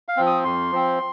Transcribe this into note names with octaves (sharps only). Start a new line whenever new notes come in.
F5
F3 C4
D#6
F2 C6
F3 C4